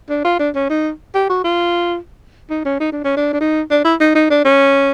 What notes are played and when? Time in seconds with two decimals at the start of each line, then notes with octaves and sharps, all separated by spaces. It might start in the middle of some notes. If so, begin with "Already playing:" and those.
0.09 D4
0.25 F4
0.39 D4
0.55 C#4
0.70 D#4
1.14 G4
1.29 F#4
1.44 F4
2.50 D#4
2.65 C#4
2.80 D#4
2.92 D4
3.04 C#4
3.16 D4
3.33 D4
3.40 D#4
3.71 D4
3.84 E4
4.00 D#4
4.15 D#4
4.30 D4
4.45 C#4